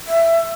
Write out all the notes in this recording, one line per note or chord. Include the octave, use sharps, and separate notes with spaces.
E5